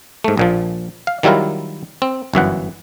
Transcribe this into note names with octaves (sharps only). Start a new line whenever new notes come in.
G#2 A3
A#1 A#2 F3
F5
D#3 F#3 G3 E4 F4 A#4
C4
G1 F#2 E3 F#5